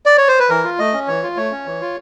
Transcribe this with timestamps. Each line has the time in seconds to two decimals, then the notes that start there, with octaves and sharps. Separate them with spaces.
0.06 D5
0.17 C#5
0.28 C5
0.39 B4
0.50 E3 A#4
0.64 F4
0.79 A3 D#5
0.94 C#4
1.08 E3 C#5
1.23 F4
1.37 A3 C#5
1.52 C#4
1.66 E3
1.81 F4